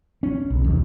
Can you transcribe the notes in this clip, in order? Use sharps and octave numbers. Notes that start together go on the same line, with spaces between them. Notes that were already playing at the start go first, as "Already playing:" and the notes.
C#4
B1
D#2